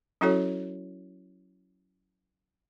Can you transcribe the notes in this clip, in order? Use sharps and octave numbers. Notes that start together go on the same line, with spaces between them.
F#3 C#4 E4 F#4 A4 C#5